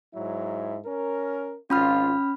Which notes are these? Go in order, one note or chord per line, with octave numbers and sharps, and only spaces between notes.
G#2 F#3 E4
C#4 A#4
G#1 C#4 F4 B5 F6